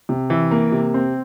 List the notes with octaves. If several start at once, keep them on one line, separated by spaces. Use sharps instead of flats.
C3
E3
A#3
C3
C4